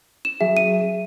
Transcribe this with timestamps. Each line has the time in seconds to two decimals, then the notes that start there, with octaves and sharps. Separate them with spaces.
0.25 E7
0.41 F#3 G#4 E5
0.57 D#7